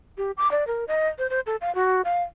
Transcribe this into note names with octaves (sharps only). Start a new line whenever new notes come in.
G4
D6
D5
A#4
D#5
C5
C5
A4
F5
F#4
F5